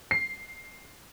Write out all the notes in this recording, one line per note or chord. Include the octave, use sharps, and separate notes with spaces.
C7